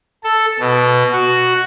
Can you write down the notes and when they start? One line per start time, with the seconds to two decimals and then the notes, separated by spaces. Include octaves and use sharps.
0.24 A4
0.60 B2
1.12 F#4